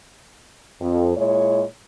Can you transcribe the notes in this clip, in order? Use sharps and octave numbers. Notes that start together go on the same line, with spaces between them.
F2
A#2 G#3 E4 C#5